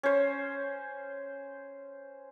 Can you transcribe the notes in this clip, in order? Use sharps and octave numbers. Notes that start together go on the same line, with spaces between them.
C#4 C5